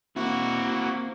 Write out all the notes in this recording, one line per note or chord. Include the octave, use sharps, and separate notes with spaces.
A#3 C4 E4 F#4